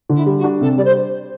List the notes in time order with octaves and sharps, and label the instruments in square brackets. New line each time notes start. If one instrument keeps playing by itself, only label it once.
[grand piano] D3
[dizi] E4
[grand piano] G3
[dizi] F#4
[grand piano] D4
[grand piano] C3 [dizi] A4
[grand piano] G3 [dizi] D5
[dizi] C5